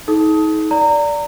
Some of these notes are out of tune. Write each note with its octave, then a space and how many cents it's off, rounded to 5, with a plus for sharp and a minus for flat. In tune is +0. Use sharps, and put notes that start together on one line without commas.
D#4 +35 A4 -45 D#6 +20
D5 -10 A#5 -25